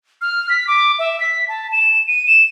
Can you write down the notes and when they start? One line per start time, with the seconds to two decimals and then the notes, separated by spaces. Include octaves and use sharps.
0.21 F6
0.50 B6
0.67 D6
0.99 E5
1.20 B6
1.48 A5
1.72 E7
2.07 D#7
2.27 E7